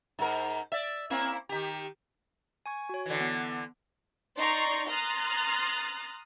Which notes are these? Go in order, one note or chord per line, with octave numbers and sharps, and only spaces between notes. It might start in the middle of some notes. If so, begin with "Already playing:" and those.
G#2 A#4
D5 E5
A#3 C4 E4
D#3 G4
G#5 C#6 G#6
F#4 C#5
D3 E3
B3
D#4 D5 A#5 C6 C#6 C7
A#5 C6 D#6 F6 F#6 A6